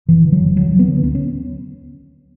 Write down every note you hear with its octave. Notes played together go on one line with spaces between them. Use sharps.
F#1 E3
D3
F#3
F#1
D2 F#3
D3
B3
D3
D2 B3
C#4